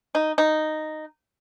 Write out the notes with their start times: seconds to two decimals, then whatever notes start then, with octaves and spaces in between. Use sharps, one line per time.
0.15 D#4
0.38 D#4